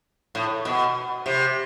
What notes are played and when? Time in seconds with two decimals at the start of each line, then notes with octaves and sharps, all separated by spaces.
0.35 A2
0.65 B2
1.26 C3